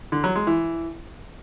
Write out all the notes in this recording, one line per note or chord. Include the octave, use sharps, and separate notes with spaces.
D3
F#3
G#3
E3